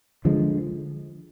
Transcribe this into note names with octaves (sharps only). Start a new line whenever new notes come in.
D3 F3 G#3